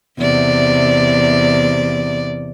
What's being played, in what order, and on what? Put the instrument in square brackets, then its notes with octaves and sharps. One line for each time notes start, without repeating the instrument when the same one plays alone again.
[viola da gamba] E2 C3 D5